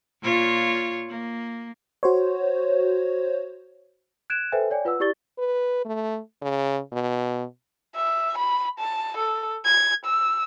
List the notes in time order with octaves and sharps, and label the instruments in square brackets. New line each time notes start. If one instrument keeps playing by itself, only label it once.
[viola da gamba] A#2 F4 C#5
A#3
[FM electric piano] F#4 C5 C#5
[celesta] F#6 G#6 D7 E7
A4 B4 C5 E5 G5 G#5
C#5 D5 G5 G#5
F4 B4 F#5 E6
E4 G4 D5 C#6 A6 G7
[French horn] B4
A3
C#3
B2
[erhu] E5
B5
A5
A4
G#6
E6